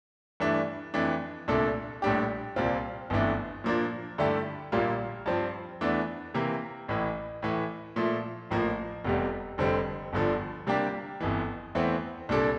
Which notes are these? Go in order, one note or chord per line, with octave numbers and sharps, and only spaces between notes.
G2 E3 A3 D4
F2 E3 A3 D4
C2 A#2 A3 D4 A4
A#1 A2 G3 D4 G4
C2 A#2 G3 C4 F4
G1 F2 E3 A3 D4
A#2 F3 A#3 D4
G2 D3 A3 E4 G4
A#1 A#2 G3 A#3 F4
G2 F3 C4
E2 E3 A3 D4
C3 E3 A#3
A1 A2 E3
A2 E3 A3
A#2 F3 A3
A1 A2 F3 A#3
F1 E2 C3 G3
F1 F2 D3 G3 C4
G1 G2 D3 F3
C3 G3 A#3 D4 G4
G1 F2 E3
E2 E3 A3 C4
C2 A#2 G3 D4 A4